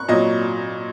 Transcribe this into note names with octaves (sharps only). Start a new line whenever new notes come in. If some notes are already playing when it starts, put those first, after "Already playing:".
Already playing: C#6 F#6
A#2 F#3 D#5